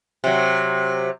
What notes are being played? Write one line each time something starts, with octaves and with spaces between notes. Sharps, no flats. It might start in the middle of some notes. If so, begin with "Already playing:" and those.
C3 F#3